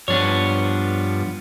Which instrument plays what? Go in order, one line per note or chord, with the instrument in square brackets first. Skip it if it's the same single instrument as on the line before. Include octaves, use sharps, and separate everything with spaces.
[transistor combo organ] G2 F3 [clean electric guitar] B3 D4 C#5